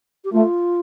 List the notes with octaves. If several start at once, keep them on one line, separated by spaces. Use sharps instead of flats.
G4
A3 F4